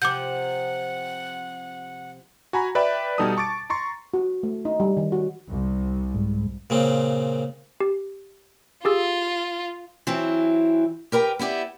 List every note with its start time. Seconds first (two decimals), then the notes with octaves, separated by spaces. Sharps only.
0.02 C3 F3 F#5 D6 G6
2.53 F#4 G#5 A#5 B5
2.75 B4 D5 E5 G5 B5
3.18 B2 G3 D#4 A4 A5 D#6
3.37 A5 C#6 D6 A6 D7
3.70 A#5 C6 C#6 A6
4.14 F#4
4.43 A3
4.65 D#4
4.80 G3
4.97 D#3
5.12 F#4
5.49 C2
6.15 G#2
6.70 A#2 C#3 C4
7.81 G4
8.85 F4 G4 G#4 E6
10.07 E3 F#3 C4 E4
11.12 G4 A#4 B4 G5
11.39 B3 E4 G4 D5